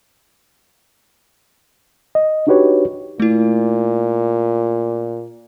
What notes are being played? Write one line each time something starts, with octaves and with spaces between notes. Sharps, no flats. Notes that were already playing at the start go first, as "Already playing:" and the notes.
D#5
D4 D#4 F#4 G4 B4 C#5
A#2 A3 E4